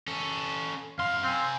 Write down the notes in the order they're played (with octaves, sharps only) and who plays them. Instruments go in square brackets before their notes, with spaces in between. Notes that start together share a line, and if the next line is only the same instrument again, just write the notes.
[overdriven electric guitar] C#4 A4
[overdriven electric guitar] F#2 C6 [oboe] F5
[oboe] C4 [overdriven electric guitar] F5 G#5